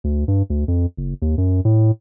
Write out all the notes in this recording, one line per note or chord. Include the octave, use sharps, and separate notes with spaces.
D2
G2
D2
F2
F#1
D#2
F#2
A2